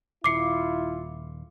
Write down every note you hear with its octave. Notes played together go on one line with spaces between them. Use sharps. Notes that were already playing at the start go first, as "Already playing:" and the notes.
D#1 E4 F4 D6 C7 C#7